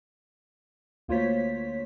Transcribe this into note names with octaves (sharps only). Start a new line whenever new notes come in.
D2 A#3 F4 C5 C#5 B6